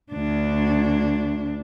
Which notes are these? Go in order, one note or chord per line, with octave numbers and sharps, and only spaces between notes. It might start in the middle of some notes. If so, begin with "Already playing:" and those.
D2 D4